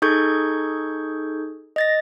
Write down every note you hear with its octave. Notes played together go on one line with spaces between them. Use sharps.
D#4 G#4 A4 C#6 G6 G#6
D#5 A6 A#6